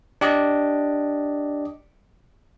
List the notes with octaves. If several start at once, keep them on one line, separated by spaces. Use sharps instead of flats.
D4 G4 D5 D#5